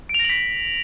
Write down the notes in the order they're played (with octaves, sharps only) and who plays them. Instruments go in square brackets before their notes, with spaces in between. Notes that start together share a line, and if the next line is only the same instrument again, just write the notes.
[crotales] D7
F7
A#6
F#7
B6